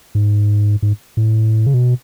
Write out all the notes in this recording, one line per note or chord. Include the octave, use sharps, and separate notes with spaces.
G#2
G#2
A2
C#3
B2